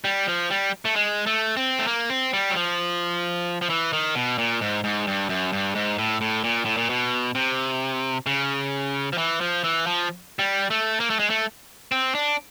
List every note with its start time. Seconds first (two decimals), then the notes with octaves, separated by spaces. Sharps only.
0.05 G3
0.28 F3
0.50 G3
0.85 A3
0.96 G#3
1.26 A3
1.57 C4
1.79 A3
1.87 A#3
2.10 C4
2.33 G3
2.51 F#3
2.56 F3
3.62 F3
3.70 E3
3.93 D#3
4.15 B2
4.38 A#2
4.61 G#2
4.84 G#2
5.07 G2
5.29 F#2
5.53 G2
5.75 G#2
5.99 A2
6.21 A2
6.44 A#2
6.65 A2
6.77 A#2
6.90 B2
7.35 C3
8.26 C#3
9.13 F3
9.18 E3
9.41 F3
9.64 E3
9.86 F3
10.39 G3
10.70 A3
11.00 A#3
11.10 A3
11.19 G#3
11.30 A3
11.92 C4
12.15 D4